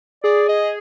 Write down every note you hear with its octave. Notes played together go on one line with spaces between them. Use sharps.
G#4 D5
D#5